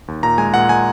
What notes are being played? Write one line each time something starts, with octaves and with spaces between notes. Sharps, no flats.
D#2
A#2 A#5
G#3 G#5
A#2 F#5
G#3 G#5